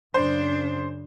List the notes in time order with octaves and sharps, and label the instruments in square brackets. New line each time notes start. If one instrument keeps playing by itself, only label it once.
[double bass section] F#2 C#3 [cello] D4 [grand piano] C5